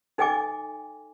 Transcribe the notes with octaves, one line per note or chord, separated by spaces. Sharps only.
D#4 A4 D#5 G5 G#5 D6